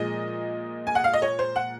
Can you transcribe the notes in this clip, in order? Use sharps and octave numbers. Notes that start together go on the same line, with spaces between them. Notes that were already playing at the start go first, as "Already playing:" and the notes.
Already playing: A#2 F3 G#3 D#5
G#5
F#5
F5
D#5
C#5
C5
F#5